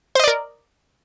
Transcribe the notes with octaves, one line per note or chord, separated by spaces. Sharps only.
A#4 C5 D5 D#5